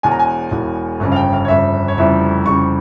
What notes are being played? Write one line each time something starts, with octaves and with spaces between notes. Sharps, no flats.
E1 E2 E3 G#5
A#5
G#5
E1 E2 E3
G1 F2 C#3 G3
F5
G5
F5
C#5
G1 F2 C#3 G3 E5
C#5
F1 F2 C#3 E3 G3 E5
F1 F2 C#3 E3 G3 C#6